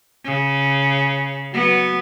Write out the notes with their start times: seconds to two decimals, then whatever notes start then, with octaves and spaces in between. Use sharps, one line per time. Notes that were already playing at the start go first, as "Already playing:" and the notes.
0.25 C#3
1.53 F#3 B3